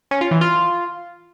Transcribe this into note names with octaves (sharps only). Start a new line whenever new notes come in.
C#4
F4
E3
F4